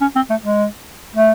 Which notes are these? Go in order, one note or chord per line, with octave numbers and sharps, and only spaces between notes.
C#4
C4
A3
G#3
A3